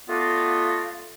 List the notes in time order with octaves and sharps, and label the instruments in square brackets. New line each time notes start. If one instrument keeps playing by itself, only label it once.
[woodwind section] A3 B3 F4 F#4 D5 F5